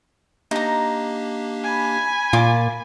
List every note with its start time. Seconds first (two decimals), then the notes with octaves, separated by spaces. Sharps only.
0.51 A#3 D4 D#4 G4 A#5
1.63 G#5 B5
2.33 A#2 F4 D6